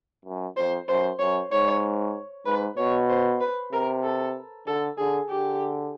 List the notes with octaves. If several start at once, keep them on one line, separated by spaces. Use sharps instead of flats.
F#2
F2 C5
F#2 C5
F#2 C#5
G#2 C#5
G#2 B4
B2 C#5
C5
B4
C3 A#4
A4
D3 A4
D3 G#4
D3 G4